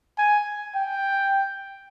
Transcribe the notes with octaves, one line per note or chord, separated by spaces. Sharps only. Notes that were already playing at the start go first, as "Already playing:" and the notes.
G#5
G5